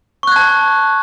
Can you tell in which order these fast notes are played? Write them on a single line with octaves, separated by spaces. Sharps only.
C#6 F#6 G#6 A5